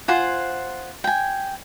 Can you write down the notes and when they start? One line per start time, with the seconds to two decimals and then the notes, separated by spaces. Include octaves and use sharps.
0.08 F4 C5 F#5 G#5
1.04 G5 G#5